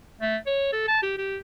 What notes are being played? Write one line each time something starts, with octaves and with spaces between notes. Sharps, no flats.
A3
C#5
A4
A5
G4
G4